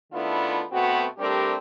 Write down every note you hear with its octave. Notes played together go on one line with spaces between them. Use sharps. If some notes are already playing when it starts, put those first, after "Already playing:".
D#3 A3 B3 D4 E4 F4
B2 A3 B3 C4 F#4
G3 A3 C4 D4 G4 A#4